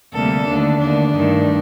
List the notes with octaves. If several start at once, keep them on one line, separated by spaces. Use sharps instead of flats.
D2 C3 G3 A#3 A4
D#2 D3 A3 D4
D#2 D3 A3 D4
G2 D#3 A3